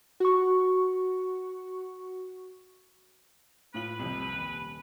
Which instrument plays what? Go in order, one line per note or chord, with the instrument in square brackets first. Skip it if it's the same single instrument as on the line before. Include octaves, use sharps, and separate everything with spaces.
[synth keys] F#4 C#6
[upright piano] A2 F4 F#7 [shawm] B4
[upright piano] C2 F2
D#1